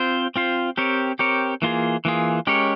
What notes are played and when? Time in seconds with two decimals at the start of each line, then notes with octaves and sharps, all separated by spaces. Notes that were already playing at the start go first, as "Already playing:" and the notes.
Already playing: C4 F4 C5
0.36 C4 F4 C5
0.77 C4 G4 A#4 C#5
1.19 C4 G4 A#4 C#5
1.62 E3 A#3 F4 G#4
2.05 E3 A#3 F4 G#4
2.47 G#3 C#4 G4 A#4 C#5